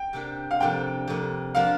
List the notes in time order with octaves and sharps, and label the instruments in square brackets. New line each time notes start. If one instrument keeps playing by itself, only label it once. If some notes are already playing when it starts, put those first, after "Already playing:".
Already playing: [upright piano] G5
[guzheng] C3 A#3 D4 G4
[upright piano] F5
[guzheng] F2 C3 A#3 D4 [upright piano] G5
[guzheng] F2 C3 A#3 D4
[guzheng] F3 A#3 D4 F4 [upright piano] F5